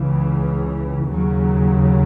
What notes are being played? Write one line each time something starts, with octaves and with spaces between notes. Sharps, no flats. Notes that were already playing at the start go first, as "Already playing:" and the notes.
Already playing: C#2 C#3 E3
D#2 C#3 F#3